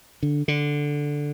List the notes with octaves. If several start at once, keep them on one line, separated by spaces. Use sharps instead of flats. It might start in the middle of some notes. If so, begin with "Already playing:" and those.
D3
D3